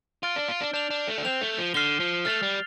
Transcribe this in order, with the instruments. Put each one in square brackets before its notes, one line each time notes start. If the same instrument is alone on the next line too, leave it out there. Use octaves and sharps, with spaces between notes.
[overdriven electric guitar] F4 [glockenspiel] F6 A6 D7 G7
[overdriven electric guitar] D4
F4
D4
[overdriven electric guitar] D4 [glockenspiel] G6 F7
[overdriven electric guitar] D4
A3
D4
[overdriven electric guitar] C4 [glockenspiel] G6 F7
[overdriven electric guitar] A3
F3
[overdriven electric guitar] D3 [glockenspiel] F6 C7 G7
[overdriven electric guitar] F3
[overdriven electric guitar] A3 [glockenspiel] F6 A6 F7
[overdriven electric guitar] G3